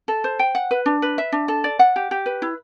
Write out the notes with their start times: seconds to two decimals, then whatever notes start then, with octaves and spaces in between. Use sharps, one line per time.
0.08 A4
0.24 C5
0.39 G5
0.55 F#5
0.71 B4
0.86 D4
1.02 B4
1.18 E5
1.32 D4
1.48 A4
1.64 D5
1.79 F#5
1.96 G4
2.11 G4
2.26 B4
2.42 E4